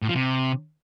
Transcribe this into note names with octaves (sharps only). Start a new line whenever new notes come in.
A2
F3
C3